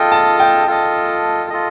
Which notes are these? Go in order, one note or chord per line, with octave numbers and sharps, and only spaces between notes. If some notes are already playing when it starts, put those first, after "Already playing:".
Already playing: F4 A4 D#5 G5 A5
A5
G5
F4 A4 D#5
F4 A4 D#5